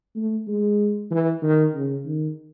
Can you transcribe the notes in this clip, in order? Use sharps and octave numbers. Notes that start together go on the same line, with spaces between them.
A3
G#3
E3
D#3
C#3
D#3